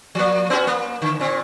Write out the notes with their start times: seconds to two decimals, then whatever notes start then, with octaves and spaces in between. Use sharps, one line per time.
0.15 F3 A#3
0.50 B3 C#4 F#4
0.67 A#3
1.02 D3
1.20 A#2 C4